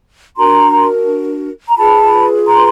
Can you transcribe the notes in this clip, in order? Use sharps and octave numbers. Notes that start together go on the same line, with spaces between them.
D4 F#4 A#4 A#5 C6
A#5
F4 G#4 B4 A5 B5
A#5 C6